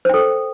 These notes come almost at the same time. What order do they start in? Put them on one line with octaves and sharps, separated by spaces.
C5 G5 A4